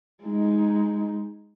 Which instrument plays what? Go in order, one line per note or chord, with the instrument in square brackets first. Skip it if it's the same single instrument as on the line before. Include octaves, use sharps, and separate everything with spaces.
[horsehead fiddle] G#3 D#4